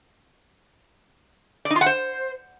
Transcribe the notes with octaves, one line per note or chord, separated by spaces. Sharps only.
D5
D#4
F4
F#5
C5